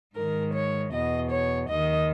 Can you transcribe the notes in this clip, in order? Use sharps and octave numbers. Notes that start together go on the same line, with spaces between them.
G#2 D#3 A#4
C#5
E2 B2 D#5
C#5
D#2 D#3 D#5